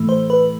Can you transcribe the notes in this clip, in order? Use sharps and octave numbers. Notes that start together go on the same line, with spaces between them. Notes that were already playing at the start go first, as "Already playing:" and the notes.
Already playing: A2 E3 A3
C5
B4